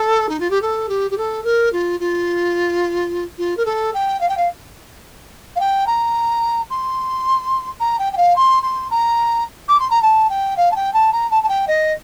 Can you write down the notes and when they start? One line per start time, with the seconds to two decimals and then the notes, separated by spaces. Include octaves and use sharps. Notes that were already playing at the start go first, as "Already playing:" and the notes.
Already playing: A4
0.29 D#4
0.40 F4
0.50 G4
0.62 A4
0.89 G4
1.11 G4
1.18 A4
1.44 A#4
1.73 F4
2.00 F4
3.38 F4
3.57 A#4
3.65 A4
3.94 G5
4.21 F5
4.29 G5
4.37 F5
5.56 F5
5.60 G5
5.87 A#5
6.70 C6
7.80 A#5
7.99 G5
8.13 G5
8.17 F5
8.36 C6
8.63 C6
8.91 A#5
9.68 D6
9.80 C6
9.90 A#5
10.02 A5
10.29 G5
10.57 F5
10.71 A5
10.76 G5
10.94 A5
11.13 A#5
11.31 A5
11.43 A5
11.49 G5
11.68 D#5